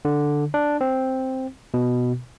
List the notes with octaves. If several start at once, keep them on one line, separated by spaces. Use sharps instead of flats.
D3
D4
C4
B2